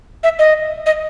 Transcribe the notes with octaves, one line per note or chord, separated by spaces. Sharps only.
E5
D#5
D#5